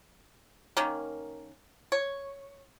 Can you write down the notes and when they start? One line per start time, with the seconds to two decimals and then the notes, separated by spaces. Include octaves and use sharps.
0.77 D#3 A#3 C#4
1.92 C#5